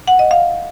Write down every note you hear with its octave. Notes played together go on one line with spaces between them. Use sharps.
F#5
D#5
F5